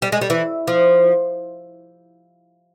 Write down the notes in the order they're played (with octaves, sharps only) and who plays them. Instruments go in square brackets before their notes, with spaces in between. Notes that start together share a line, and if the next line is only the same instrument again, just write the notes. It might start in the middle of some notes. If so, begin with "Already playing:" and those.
[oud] G3
G#3
G3
E3
F3